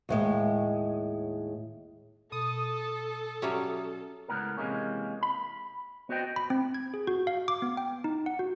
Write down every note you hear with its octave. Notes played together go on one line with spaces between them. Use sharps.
D#2 A2 G#3
B2 A4 D#6
F#3 G3 C#4 F#4 G4 E5
C#2 A2 B3 A#4
C3 E3 G#3 A#3 C#4
B5
B3 F#4 C5 D#5 G5
B5
C4
G#6
G#4
F#4
F5
D6
B3
G5
D#4
F#5
F#4